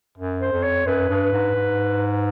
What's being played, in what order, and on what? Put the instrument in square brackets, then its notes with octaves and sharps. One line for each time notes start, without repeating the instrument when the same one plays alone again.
[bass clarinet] F#2
[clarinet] C5
[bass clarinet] F2
[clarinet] C#5
[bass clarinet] F#2 [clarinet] B4
[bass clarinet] G2
G#2
G#2